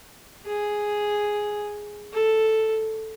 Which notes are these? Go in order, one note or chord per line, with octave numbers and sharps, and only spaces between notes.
G#4
A4